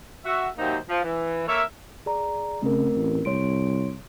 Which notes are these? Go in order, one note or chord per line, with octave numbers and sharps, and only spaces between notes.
F#4 E5
D#2 C3 F#3 A#3 D#4 C5
F3
E3
A#3 A4 A#4 C#5 E5
G#4 D5 A#5
C#3 A3 C4 A#4
A1
C2 C#5 C6 D7